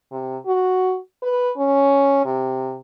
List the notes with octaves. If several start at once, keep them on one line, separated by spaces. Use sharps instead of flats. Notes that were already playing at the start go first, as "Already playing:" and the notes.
C3
F#4
B4
C#4
C3